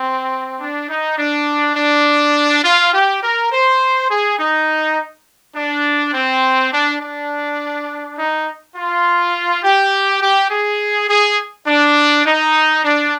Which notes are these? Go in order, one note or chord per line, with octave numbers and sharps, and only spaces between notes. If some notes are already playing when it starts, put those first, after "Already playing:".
Already playing: C4
D4
D#4
D4
D4
F4
G4
A#4
C5
G#4
D#4
D4
C4
D4
D4
D#4
F4
G4
G4
G#4
G#4
D4
D#4
D4